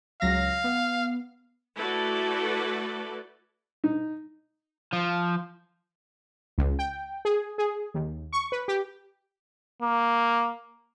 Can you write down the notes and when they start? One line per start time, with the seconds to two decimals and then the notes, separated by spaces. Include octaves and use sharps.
0.21 C#2 F#3 F5 A#6
0.64 B3
1.75 A3 E4 F#4 A4 B4 D5
3.84 D#4
4.93 F3
6.58 C#2
6.79 G5
7.25 G#4
7.58 G#4
7.94 D#2
8.33 C#6
8.52 B4
8.68 G4
9.82 A#3